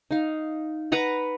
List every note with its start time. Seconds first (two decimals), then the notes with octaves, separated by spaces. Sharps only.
0.11 D#4 F5
0.92 B4 F#5 A#5 B5